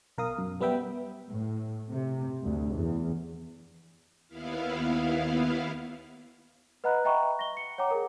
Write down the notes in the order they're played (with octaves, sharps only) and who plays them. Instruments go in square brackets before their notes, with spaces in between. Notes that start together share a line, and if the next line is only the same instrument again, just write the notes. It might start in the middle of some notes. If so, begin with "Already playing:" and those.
[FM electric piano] B1 A#4 F5 D#6
F#2
G3 B3 B4 E5 G5
[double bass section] A2
C3
D2
E2
[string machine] D#2 B3 E4 F5
[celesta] B4 D#5 F#5 A#5 B5 F#6
D#5 E5 G5 A#5 B5 C#6
A#6 G7
C#7
C#5 F#5 G5 A#5 D6
G#4 A#4